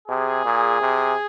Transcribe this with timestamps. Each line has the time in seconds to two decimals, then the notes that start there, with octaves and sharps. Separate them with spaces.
0.09 C3 G#4
0.45 A#2
0.81 C3